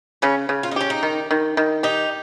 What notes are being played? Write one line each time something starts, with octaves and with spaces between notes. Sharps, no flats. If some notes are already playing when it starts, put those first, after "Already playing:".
C#3 C#4
C#3
F4
D#4
C#4 G4
D#4
D#3
D#3
D#3
D#4 G4